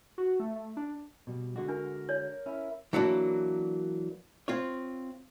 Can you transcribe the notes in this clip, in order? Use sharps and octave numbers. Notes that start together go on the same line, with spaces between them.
F#4
A3
A3
D4
B2 G3
D3 G#3 F#4
D4 A#4
C#5 D5
C#4 E4
E3 F#3 A#3 D4
C4 F4 C#5